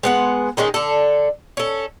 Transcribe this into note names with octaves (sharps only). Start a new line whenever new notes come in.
G#3 B3 F#5
D#3 G#3 C#4 D#4
D3 A4
C#4 A4